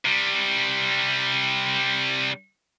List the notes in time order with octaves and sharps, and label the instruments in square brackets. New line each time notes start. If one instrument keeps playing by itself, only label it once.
[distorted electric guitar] C3 G3